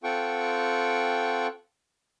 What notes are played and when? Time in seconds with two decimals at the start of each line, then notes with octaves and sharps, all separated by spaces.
0.04 C4 F4 A4 F#5 G5 C#6